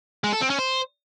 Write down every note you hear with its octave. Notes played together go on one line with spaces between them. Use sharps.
G#3
A4
C4
C#4
C5